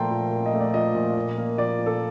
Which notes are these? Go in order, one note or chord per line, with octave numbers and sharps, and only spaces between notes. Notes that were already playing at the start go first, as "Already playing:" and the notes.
Already playing: A#2 F3 A3 G5 A5 A#5 C6
A#2
A#2
D#5
A3
D5
F3 D#5
A#2
A#2
A#3
F3 D5
A#2
A4